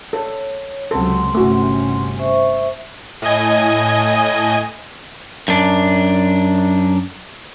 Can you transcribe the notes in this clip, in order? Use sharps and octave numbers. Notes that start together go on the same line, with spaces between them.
A4 C#5
C#2 C3 F#3 C4 A4 F#5 C6
G1 C3 A3 C#4 F#4
C5 E5 C#6
A2 D#5 G#5
F#2 D4